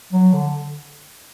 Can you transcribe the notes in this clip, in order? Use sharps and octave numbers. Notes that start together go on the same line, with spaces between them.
F#3
D3